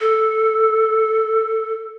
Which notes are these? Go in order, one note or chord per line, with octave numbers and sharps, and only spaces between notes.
A4